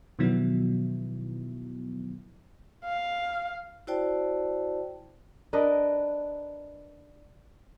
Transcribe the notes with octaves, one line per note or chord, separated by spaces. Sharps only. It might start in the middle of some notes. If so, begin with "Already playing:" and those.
B2 D#3 F3 F#3 B3 E4
F5
E4 F#4 C5 D5 G5 A5
D4 A#4 B4 D#5